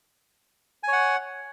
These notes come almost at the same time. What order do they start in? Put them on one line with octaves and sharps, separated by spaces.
G#5 C#5 F#5